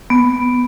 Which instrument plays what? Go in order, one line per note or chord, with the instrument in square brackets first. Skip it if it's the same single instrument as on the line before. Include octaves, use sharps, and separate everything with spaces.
[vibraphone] B3